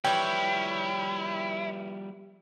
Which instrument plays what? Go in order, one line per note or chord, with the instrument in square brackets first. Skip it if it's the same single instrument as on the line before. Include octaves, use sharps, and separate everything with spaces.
[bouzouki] E3 C#5 [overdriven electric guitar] F3 G3 [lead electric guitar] E4 [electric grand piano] G5